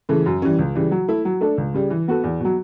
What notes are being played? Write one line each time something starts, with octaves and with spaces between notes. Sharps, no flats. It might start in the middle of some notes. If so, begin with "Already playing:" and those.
C#3 E3 A3
F#2
E3 G3 C#4
C#2
C#3 E3 G3
F#3
A3 E4
F#3
A3 D4 A4
C#2
C#3 G3
E3
B3 F#4 A4
E2
B2 F#3